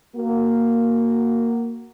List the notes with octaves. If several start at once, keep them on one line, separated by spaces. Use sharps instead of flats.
A#3 F#4